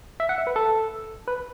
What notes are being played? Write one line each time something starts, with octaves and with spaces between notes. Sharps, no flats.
E5
F#5
E5
B4
A4
B4